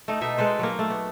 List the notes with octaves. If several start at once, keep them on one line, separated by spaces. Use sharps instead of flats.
A3 D#4
B2 D#4 E5
G#3 A4 B4 C5
F#3 A#3
A3
B3